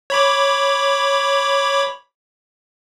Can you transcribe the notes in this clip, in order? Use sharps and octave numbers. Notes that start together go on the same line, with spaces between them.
C#5 B5 D6